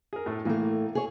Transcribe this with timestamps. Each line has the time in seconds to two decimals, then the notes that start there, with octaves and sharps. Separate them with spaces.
0.13 G#4 A#4
0.26 A2 A3
0.45 A2 E3 A3 A#3
0.95 G#4 C#5